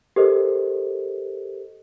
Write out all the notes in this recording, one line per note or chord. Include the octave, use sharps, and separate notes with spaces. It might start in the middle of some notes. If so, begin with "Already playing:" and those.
G4 A4 A#4 C5 D#5